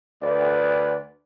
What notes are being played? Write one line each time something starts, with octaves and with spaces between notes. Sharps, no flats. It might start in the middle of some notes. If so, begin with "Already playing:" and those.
D2 B4 D5